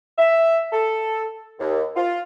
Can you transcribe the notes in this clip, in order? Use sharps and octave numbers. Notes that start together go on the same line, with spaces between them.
E5
A4
D#2
F4